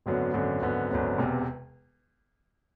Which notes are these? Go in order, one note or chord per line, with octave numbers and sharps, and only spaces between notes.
G#1 F#2 D3 F#3 B3
G#1 F#2 D3 F#3 B3
G#1 F#2 D3 F#3 B3
G#1 F#2 D3 F#3 B3
E1 E2 C3